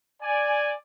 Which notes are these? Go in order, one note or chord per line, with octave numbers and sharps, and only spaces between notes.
D5 G#5